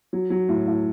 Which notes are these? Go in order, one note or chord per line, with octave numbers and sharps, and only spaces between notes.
F#3
F#3
A2
A2